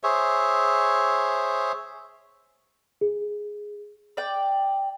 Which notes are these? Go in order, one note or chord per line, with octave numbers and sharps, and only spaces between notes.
G#4 C5 C#5 E5
G#4
D5 G5